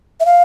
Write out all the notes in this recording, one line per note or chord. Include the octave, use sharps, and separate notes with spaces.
E5
F5